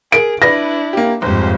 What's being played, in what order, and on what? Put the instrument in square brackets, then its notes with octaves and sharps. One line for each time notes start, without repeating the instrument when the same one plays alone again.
[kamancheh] G#4 [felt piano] A#4 D7
[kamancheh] D4 E4 [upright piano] B4 D5 [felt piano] A#6
[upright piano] A#3 G4
[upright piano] G1 [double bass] F2 G#2 [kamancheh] G4 C5